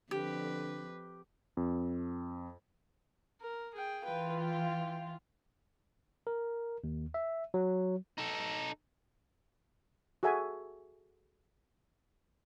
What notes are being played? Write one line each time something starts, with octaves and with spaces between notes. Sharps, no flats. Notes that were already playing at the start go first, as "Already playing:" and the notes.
F2 D3 G4 B4
F2
A#4
G#4 G5
E3 F4 B4 G5
G5
A#4
D#2
E5
F#3
D#4 A4
F#4 G#4 A4 E5 G#5